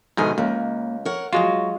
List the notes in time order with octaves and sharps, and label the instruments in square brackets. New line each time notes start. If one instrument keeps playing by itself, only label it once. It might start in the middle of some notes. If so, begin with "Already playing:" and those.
[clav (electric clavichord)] G#2 B2 D#3 [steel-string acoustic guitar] D3 D#5 G#5
[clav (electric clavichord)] C#2 [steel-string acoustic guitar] A#3
[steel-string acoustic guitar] A#4 C#5 F#5
[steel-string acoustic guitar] F#3 F#4 [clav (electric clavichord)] G#3 F4